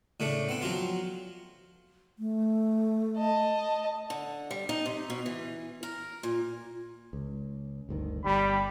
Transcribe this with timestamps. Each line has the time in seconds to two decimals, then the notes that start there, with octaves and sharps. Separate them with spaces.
0.20 A2 C#3 A3 D4
0.49 B3 C4
0.62 F3 F#3 C4 F4
2.19 A3
3.17 D#5 A5
4.10 D3
4.51 G3
4.69 D#4
4.86 C3
5.10 B2
5.26 E3
5.83 A#4
6.23 A#2
7.13 C#2
7.89 G1 D2 D#3
8.25 G1 G3 B5